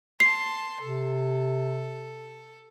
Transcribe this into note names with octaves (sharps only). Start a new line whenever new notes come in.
A5 C6 C7
C3 A4